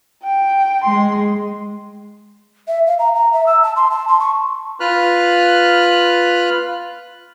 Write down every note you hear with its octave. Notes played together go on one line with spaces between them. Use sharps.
G5
G#3 C6
E5
F5
A#5
A#5
E5
E6
A5
C6
A5
C6
C#6
F4 B4 B5 F6 F#6